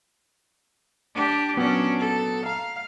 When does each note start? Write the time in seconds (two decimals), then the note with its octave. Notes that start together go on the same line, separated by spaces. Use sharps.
1.15 D4 G4
1.57 A#2 F#3 B3 C#4 D4
1.99 A4
2.46 F5 A#5